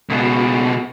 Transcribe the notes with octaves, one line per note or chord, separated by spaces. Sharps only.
C#2 B2